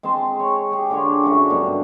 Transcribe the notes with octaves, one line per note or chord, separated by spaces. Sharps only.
G#3 C4 A5 C6
C#5
G4 G#4
D3 D4 F4 C#5
F#2 A3 D4 F#4
G2 B2 G3